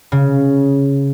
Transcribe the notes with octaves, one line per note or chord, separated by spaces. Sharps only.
C#3